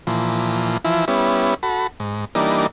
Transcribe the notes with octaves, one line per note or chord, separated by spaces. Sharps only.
A#2 E3 F3
E3 F3 E4
G3 B3 C#4 E4
F#4 A4 B5
G#2
E3 G3 A#3 D4 D#4